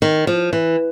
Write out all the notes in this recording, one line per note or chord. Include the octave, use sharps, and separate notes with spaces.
D#3
F3
E3